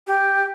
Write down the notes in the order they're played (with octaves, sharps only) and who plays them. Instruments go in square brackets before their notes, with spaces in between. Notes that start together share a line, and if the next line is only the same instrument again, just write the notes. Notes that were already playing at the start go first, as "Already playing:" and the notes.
[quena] G4